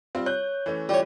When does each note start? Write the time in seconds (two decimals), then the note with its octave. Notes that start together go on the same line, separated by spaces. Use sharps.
0.15 G3 C4 F4
0.26 C#5 F#6 G6
0.66 E3 A3 C#4
0.89 G3 F4 C#5